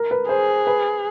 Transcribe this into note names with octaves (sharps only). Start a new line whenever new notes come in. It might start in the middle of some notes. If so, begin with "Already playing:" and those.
Already playing: A#4
B4
G#4 C5
B4